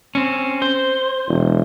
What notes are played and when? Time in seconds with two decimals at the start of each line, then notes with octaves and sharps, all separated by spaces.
0.15 C4 C#4
0.62 C5
1.28 E1